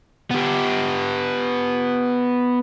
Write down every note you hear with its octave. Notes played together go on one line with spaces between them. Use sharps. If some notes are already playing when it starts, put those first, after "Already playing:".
B3 G4